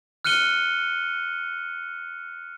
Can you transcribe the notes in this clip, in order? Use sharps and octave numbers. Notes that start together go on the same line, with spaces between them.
F6 F#6 C#7 D#7 G7